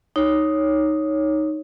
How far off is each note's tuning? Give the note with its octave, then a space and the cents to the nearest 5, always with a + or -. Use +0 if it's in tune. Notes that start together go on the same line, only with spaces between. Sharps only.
D#4 +0 C#5 +0